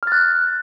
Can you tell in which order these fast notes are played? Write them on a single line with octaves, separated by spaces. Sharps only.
F6 A6 F#6